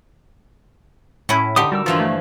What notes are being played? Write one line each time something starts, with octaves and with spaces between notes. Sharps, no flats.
A2 C#4 E4
D3 D#4 G4 D#6
G3 F#4 A#4 E6
G2 E3 F3 F4
A3